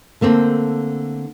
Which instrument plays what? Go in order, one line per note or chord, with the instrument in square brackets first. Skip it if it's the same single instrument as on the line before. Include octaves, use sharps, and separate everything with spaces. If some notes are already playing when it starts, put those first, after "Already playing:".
[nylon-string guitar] D3 A3 A#3 C4